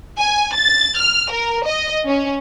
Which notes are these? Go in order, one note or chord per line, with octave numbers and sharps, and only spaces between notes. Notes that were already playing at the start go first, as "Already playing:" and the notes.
G#5
A6
F6
A#4
D#5
C#4